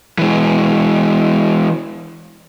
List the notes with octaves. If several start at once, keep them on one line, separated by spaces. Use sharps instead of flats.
E3 G#3